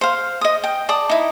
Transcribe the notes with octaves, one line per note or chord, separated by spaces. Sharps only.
C5 F5
D#5 D#6
G5
D5 A5 D#6
D#4 E4